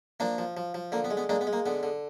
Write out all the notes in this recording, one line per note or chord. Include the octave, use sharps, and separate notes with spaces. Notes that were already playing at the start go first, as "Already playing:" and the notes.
F3 A#3 D4
F3
F3
F3
D3 A#3
B3
G#3
B3
G#3 A#3 D4
B3
G#3
A#3
D3 B3
D3